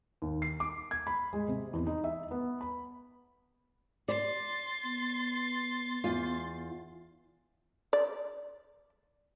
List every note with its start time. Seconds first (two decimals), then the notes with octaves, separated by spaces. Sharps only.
0.22 D#2
0.42 C7
0.60 D6
0.91 G#6
1.07 B5
1.33 G#3
1.48 C3
1.73 E2
1.87 D#4
2.04 E5
2.31 B3
2.61 B5
4.08 D5 C6 A6
4.85 B3
6.04 E2 F4
7.93 D5